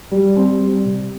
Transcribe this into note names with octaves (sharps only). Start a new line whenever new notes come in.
G3
C4
G3
C3